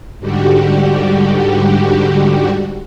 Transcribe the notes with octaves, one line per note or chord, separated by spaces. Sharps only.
G#2 D3 G3 F#4 G4